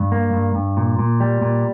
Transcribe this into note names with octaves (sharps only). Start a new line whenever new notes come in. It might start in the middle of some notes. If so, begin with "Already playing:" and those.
Already playing: G2
A#3
G2
G2
A#2
A#2
G3
A#2